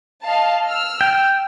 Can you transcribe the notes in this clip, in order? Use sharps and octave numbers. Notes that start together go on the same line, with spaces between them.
D#5 F5 A5
E6 F6
G5